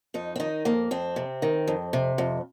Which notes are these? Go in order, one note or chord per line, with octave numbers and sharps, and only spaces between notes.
F2 D#4
C4
D#3 D#4
F2 A#3
F2 C4
C3
D#3
F2
C3
F2